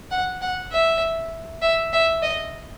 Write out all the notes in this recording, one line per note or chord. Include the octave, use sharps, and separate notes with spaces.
F#5
F#5
E5
E5
E5
D#5